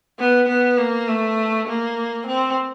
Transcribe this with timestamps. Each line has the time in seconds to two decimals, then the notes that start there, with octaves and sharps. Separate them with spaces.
0.19 B3
0.48 B3
0.78 A#3
1.08 A3
1.67 A#3
2.26 C4